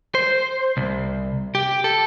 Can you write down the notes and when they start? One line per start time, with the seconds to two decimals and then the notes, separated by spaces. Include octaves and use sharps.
0.15 C5
0.77 C2
1.55 G4
1.84 A4